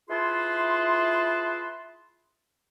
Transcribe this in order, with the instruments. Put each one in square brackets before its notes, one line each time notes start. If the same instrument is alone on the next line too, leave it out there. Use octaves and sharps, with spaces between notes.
[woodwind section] E4 F4 G#4 B4 A5 C6